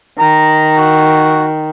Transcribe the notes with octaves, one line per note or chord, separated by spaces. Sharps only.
D#3 A#5
F#4